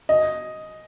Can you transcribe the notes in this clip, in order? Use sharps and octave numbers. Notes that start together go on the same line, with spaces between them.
D#5